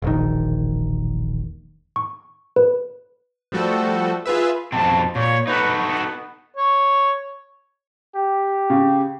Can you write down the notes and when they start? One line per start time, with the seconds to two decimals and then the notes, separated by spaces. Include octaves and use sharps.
0.02 E1 A#1 D#3
1.96 C#6
2.56 B4
3.52 F3 G3 A3 F#4 A4
4.26 F4 G#4 B4 E5
4.72 F2 B2 C4 A5
5.15 A#2 C#5
5.47 D#4 F#4 A4 B4
5.87 B3
6.57 C#5
8.15 G4
8.70 C#3